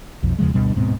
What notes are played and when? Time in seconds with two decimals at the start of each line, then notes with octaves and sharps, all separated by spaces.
0.23 B1 F2
0.39 E2 C#3 F3 G#3
0.54 D2 G2 B2 G3
0.75 D1 G#2 B2 C4